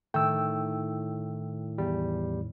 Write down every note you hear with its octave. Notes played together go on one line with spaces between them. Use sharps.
A2 D#3 A3 G5 E6
E2 G3